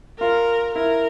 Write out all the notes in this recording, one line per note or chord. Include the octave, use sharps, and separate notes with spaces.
F4 A#4
E4 A#4